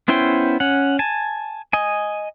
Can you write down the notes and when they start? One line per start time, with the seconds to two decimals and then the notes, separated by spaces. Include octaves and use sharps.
0.08 B3 C#4 E4 C5 G5
0.60 C#4 F#5
0.99 G#5 A5
1.73 D#5 G#5